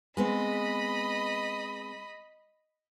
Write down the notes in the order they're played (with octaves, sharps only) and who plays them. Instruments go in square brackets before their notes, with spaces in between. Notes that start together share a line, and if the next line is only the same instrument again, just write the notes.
[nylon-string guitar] G#3 B3 C4 [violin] D#5 B5